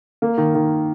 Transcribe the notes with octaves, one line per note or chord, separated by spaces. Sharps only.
A#3
D#3
D#3